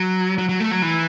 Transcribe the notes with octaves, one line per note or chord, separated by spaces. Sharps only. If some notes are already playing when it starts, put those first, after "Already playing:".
Already playing: F#3
F#3
F#3
A3
F#3
E3